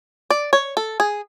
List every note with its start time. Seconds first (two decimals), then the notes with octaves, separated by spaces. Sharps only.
0.30 D5
0.53 C#5
0.77 A4
1.00 G#4